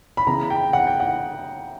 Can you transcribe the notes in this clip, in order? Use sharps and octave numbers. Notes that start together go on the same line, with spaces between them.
B5
C#3 E3 B3 A#5
G5
F#5
G5
F#5